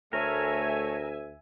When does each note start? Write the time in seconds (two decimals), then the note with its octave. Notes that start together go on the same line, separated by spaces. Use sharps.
0.13 D2 A3 A#4 C#5 E5 G#5